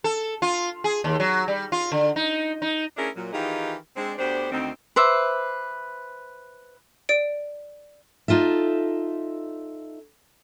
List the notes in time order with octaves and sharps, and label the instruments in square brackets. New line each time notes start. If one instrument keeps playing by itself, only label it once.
[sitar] A4
F4
G#4
D#2
F#3
G3
F4
D3
D#4
D#4
[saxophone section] A3 C#4 D4 E4 G#4 A#4
A#2 F#3
D#3 E3 D#4 F4 G4 G#4
G#3 C4 D4
D2 B3 D4 G4 C5
D2 D#3 C4
[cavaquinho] B4 C5 E5 D6
[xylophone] D5 D7
[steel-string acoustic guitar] D#4 F4 A4 E5